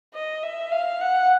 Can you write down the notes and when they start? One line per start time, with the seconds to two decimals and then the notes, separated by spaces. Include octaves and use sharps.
0.14 D#5
0.43 E5
0.72 F5
1.01 F#5